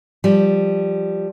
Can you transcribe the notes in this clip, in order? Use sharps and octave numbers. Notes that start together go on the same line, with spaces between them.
F3 G3